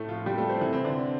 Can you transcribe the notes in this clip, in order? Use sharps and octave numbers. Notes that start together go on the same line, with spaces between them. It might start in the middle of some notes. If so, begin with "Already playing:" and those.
Already playing: A2 A3
F3 F4
G3 G4
A3 A4
C4 C5
E3 E4
C3 C4
D3 D4